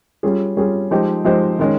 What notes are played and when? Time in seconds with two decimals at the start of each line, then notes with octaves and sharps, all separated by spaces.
0.23 G3 C#4 F4 G#4
0.57 G3 C#4 F4 G#4
0.91 F3 G#3 D#4 G4 C5
1.25 F3 G#3 D#4 G4 C5
1.59 D#3 G#3 C#4